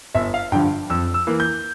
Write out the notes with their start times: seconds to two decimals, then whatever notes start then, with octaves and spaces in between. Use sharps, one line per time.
0.14 G1 E5
0.34 F5
0.52 G2 D3 F3 G5
0.90 F2 E6
1.14 E6
1.27 E3 A#3
1.40 G6